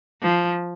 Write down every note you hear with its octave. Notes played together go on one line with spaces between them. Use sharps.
F3